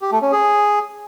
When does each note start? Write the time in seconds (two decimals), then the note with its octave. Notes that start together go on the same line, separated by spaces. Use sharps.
0.02 G4
0.12 A3
0.22 C#4
0.32 G#4